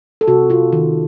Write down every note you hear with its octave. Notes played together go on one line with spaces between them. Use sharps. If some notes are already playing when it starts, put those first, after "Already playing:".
A4
C3 F#4
C3 F4
D#3